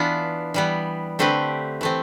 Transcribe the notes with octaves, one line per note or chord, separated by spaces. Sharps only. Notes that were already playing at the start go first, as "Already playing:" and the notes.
Already playing: E3 B3 D4 F4
E3 G3 B3
D3 A3 C4 G4 B4
E3 A3 C4